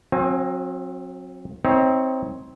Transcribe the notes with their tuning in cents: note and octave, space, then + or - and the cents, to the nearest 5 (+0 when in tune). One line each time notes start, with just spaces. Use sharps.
F#3 -30 C4 +25 G#5 +15
C4 +0 D#4 +35 C#5 +0